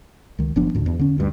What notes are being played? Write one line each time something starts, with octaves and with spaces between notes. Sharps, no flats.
C#2 D#3
F#1 F3 B3 D4
D2 G#2
E2
D3 C#4
D2 G2